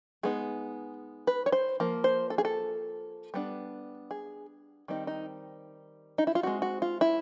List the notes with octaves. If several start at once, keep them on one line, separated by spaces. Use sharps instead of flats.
G#3 B3 D#4 G#4
B4
C#5
C5
F3 A#3
C5
A4
G#4
A4
G3 B3 D4
G#4
D#3 G3 C4 D#4
D#4
D#4
E4
F4
G#3 C4 D#4 F#4
F#4
F4
E4